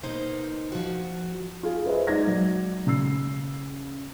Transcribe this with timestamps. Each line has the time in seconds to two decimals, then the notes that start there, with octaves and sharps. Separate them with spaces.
0.03 B2 A#3 D#4 C5
0.72 F3 F#4
1.63 F4 G#4
1.85 G#4 B4 C5 D#5 E5
2.07 G#3 D#4 D5 G#6 A#6
2.23 F#3 D5
2.87 C#3 E6 C7